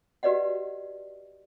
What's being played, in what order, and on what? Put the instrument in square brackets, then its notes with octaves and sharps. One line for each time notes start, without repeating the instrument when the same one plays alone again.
[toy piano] F#4 G4 B4 D5 D#5 F#5